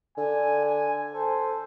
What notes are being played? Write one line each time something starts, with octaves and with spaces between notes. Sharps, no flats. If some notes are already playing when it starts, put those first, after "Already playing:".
D3 G#5
G#5
A4 C5